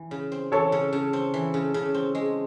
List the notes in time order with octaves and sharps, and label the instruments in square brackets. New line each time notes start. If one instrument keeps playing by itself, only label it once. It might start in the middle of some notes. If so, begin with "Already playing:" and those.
Already playing: [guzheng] E3
C#3
C4
[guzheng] E3 [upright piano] A4 C#5
[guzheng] C#3
C#3
C4
E3
C#3
C#3
C4
G#3